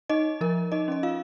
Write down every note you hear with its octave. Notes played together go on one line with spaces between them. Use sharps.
D#4 D#5
F3 A#4
D#4 D#5
C#4 D#5
F4 F5